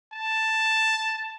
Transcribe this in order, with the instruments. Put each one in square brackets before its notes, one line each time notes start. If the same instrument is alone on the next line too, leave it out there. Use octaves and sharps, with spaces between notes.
[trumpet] A5